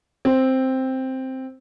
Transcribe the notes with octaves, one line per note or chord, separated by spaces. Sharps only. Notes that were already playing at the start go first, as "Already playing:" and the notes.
C4